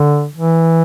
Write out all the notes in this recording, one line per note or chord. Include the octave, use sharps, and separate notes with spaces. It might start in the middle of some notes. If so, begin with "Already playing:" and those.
Already playing: D3
E3